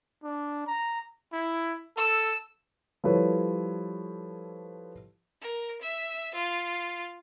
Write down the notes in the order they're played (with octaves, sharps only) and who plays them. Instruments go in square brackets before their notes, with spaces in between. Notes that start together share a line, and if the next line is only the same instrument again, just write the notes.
[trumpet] D4
A#5
[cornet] E4
[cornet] A4 [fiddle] E6
[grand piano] F3 G3 E4 A4 B4 C#5
[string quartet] A#4
E5
F4